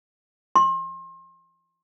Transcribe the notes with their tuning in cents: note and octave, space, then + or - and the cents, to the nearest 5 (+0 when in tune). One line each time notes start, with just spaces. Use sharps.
C6 +35